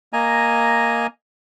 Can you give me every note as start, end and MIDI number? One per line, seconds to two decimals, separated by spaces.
0.13 1.07 58
0.13 1.07 75
0.13 1.07 80
0.13 1.07 82